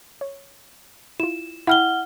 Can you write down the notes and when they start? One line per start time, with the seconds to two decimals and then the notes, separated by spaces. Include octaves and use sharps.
0.21 C#5
1.20 E4 F4 E7
1.67 E4 E5 F#5 G5 F6 G7